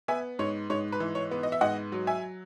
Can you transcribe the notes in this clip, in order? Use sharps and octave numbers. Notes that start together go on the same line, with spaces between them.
B3 E5 G#5
G#2 C#5
G#2 C#5
B4
E3
C#5
B3
D#5
E5
G#2 D#5 F#5
F#3
E5 G#5